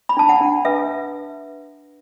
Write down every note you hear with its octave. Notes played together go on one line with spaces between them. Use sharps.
B5
D4 A5
F#5
D4
B4 E5